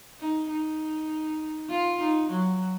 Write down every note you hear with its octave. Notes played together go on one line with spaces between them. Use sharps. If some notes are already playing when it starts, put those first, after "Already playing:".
D#4
D#4
F4
D#4
F#3